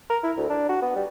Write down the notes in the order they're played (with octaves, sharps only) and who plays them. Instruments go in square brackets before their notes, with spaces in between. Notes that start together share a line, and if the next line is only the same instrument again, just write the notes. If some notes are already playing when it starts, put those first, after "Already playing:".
[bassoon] A#4
E4
D2
D4
F#4
B3
G3